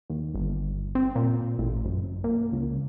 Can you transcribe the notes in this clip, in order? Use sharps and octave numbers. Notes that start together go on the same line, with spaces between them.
D#2
G1
C4
A#2
A1
F#1
A#2
C#2